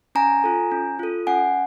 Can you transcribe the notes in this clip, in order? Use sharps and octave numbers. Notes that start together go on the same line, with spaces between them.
C#4 G#5 A#5
F4 A4
C#4
F4 A4
C#4 F#5 G#5